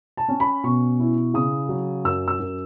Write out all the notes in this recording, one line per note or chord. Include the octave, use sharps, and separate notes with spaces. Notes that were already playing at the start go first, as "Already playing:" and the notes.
A5
C#4
B5
B2 C#6
E4
C#3 D#6
F#3
F#2 E6
E6
F#2